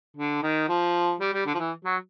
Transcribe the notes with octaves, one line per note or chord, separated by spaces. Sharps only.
D3
D#3
F3
G3
G3
D3
F3
E3
F#3